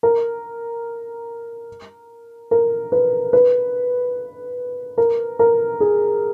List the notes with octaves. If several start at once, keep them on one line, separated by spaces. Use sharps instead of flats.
A#4
A#4
B4
B4
A#4
A#4
G#4